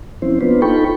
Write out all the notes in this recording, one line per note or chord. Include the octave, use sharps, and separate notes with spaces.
F3 C4 C#4 E4 C5
A#3 B3 D4 F4 B4 C5
D#4 F4 A4 G5 B5 C#6